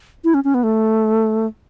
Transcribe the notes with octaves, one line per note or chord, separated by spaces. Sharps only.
E4
C#4
C#4
B3
A3